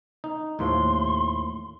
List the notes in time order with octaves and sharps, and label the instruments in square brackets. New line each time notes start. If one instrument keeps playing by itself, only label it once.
[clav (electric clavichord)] D#4
[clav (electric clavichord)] D#2 A2 F3 [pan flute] C6